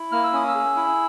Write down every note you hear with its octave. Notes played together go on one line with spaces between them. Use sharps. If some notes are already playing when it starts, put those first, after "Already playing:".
Already playing: E4
A#3 F6
E6
C#4 D#6
E6
G#4
E4